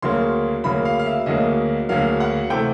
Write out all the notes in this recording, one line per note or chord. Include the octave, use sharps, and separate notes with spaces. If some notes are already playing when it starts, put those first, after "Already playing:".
D2 C#3 F#3 A#3 C6
D2 C#3 F#3 A#3 B5
F5
F5
E5
D2 C#3 F#3 A#3 D#5
D2 C#3 F#3 A#3 F5
F#5
C3 E3 A3 G5